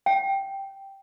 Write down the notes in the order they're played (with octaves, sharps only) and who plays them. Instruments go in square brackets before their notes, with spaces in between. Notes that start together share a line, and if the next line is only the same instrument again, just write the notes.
[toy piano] G5